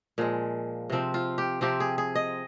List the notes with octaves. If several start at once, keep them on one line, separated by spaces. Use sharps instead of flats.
A#2 F3 G#3
C3 F3 C4
F4
G4
C3 F3 C4 G4
G#4
G#4
D#5